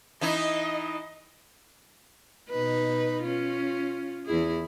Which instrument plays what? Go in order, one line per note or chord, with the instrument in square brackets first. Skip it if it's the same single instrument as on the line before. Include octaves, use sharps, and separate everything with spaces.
[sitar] E3 D#4 E4 [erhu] D#5
[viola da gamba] B2 D#4 B4
C#4 F4
E2 E4 G#4